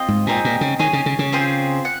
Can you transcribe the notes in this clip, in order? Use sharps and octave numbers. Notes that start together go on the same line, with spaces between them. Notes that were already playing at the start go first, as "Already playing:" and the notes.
Already playing: C4 F4 D#5
G#2
A#2 C4 D#4 G#4
A#2
C#3
D#3 G#4 C#5 G#5
C#3
C#3
C#3
C4 F4 G#4 C5
F#5